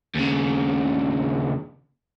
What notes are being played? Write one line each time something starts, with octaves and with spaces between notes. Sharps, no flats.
D#2 C#3